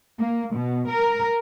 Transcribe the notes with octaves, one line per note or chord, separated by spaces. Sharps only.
A#3
B2
A#4